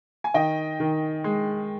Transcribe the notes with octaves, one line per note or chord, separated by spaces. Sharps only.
G#5
D#3 D#5 G5
D#3
G#3